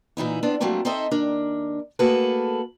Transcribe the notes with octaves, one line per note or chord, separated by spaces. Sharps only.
A#2 E3 D#4 E4
B3 C4 D4
F#3 G3 A3 A#3 C4 D4
C4 D#4 A4 C5 D#5 E5
D#2 D4 A#4
A3 A#3 F#4 G#4 A4 B4